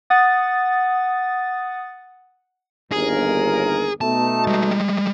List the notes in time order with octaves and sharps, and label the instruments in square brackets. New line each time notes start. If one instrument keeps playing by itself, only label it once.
[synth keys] F#5 D#6 A6
[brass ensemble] G1 D#2 A#4 [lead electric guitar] G#4
[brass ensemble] B2 A3 D#4 [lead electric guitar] A5
[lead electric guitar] G3 G#3